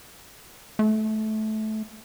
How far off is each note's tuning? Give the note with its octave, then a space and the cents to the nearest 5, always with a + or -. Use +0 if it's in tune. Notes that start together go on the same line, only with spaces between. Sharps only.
A3 -20